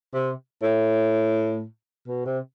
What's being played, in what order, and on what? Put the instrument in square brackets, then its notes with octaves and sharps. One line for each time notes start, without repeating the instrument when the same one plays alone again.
[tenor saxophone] C3
A2
B2
C3